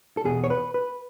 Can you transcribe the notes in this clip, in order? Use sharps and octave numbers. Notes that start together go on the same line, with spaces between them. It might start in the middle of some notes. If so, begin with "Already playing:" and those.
A4
E2 B2 G#4
C#5
B4
B4